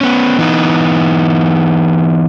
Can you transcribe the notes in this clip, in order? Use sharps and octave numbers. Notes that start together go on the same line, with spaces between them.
B3 C#4
E3 B3 D#4